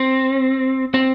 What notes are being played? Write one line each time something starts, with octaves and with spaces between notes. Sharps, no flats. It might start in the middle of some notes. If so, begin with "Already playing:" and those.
Already playing: C4
C4